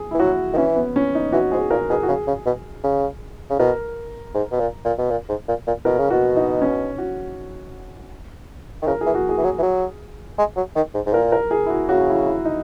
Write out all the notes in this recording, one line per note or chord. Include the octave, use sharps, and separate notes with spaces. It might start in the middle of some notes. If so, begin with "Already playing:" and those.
Already playing: G#4
E4
E3
F#3 F#4
D#3
E3 C#4
B3
C#4
D#4
E3 F#4
G#2 G#4
A#2 A#4
B2 G#4
F#4
C#3 G#4
C#3
B2
C#3
C#3
B2 A#4
G#2
B2
A#2
A#2
B2
A#2
G#2
A#2
A#2
B2 A#4
C#3
B2 F#4
D#4
C#4
F#4
D#3
C#3 A#4
E3 G#4
F#4
G#4
E3
F#3
E3
F#3
G#3
F#3
D#3
G#2
G#2
A#2 A#4
A#4
G#4
E4
F#4
C#3 F#4
E4
E4
D#4